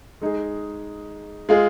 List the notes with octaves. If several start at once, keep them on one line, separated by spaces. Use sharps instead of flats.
G#3 D#4 G#4
G#3 F4 G#4